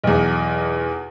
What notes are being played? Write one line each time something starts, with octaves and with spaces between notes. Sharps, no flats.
B1 E2